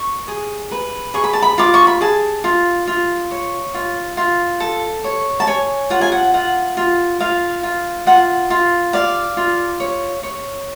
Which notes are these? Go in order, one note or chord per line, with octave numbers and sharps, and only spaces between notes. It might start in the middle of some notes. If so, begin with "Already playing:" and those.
Already playing: C#6
G#4
B4
G#4 C#6
B5
A5
B5
F4 D6
C#6
B5
G#4 A5
F4
F4
C#5
F4
F4
A4
C#5
A5
C#5 G#5
F4 F#5
G#5
F#5
F4 F#5
F4
F4 F5
F4
F4 F#5
F4
D5 F5
F4
C#5
C#5